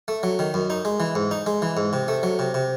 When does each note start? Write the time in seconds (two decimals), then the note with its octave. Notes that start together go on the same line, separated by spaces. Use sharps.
0.08 A3
0.23 F#3
0.39 D#3
0.54 F#2
0.70 D#4
0.85 G#3
1.00 E3
1.15 G#2
1.31 D#4
1.46 G#3
1.62 E3
1.77 G#2
1.93 C3
2.08 A3
2.23 F#3
2.39 C3
2.54 C3